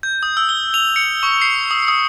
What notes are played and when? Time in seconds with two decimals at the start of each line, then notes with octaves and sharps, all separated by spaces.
0.03 G6
0.23 D#6
0.37 E6
0.49 G7
0.74 F7
0.96 C#7
1.23 C#6
1.42 C7
1.71 D#6
1.88 D#6